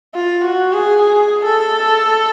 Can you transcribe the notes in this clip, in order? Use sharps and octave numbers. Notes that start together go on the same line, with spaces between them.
F4
F#4
G#4
G#4
A4